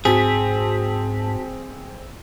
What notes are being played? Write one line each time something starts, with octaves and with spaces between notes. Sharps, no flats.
G#2 C4 F#4 G#4 A5 B6